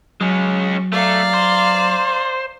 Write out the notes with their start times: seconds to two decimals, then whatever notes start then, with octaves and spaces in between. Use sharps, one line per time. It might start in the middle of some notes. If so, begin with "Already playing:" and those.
0.21 F#3 G#3 C#4
0.92 A3 D5 F5 A#5
1.34 C5